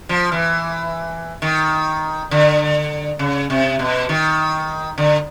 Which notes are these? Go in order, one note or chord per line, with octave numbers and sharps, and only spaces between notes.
F3
E3
D#3
D3
C#3
C3
B2
D#3
D3